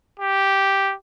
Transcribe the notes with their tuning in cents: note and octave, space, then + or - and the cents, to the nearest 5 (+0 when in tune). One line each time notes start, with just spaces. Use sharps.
G4 -5